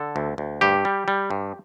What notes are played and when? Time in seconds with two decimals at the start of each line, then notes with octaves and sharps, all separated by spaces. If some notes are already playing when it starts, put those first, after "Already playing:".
Already playing: D3 A4
0.16 D2
0.38 D2
0.61 G2 G4
0.85 G3
1.08 G3
1.30 G2